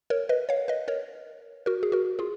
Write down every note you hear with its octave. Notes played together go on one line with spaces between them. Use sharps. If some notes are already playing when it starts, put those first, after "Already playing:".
A#4 C#5
B4 D#5
C#5 F5
B4 D#5
A#4 C#5
F#4 A#4
G#4
F#4 A#4
F4 G#4